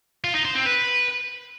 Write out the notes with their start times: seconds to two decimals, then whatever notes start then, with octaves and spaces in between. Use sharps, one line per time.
0.24 F4
0.35 D#4
0.45 C5
0.56 C4
0.66 B4